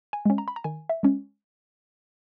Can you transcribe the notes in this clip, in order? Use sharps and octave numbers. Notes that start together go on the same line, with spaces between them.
G#5
G#3 C#4
A#5
B5
A#5
D#3 G#5
E5
G#3 C#4